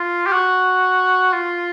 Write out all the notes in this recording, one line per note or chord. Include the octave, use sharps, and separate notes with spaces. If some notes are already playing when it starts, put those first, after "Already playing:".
Already playing: F4
G4
F#4
F4